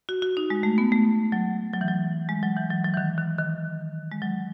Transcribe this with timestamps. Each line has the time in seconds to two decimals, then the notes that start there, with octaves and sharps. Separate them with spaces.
0.09 F#4
0.22 F#4
0.37 D#4
0.50 G#3
0.63 A3
0.78 B3
0.92 A3
1.32 F#3
1.73 F#3
1.81 E3
1.88 F#3
2.29 G#3
2.43 F#3
2.57 E3
2.70 F#3
2.84 F#3
2.94 E3
2.97 D#3
3.18 D#3
3.38 D#3
4.12 G#3
4.22 F#3